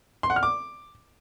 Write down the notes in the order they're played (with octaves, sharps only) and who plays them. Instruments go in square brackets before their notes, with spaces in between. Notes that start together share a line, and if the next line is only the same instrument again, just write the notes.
[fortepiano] C6
F#5
F6
D6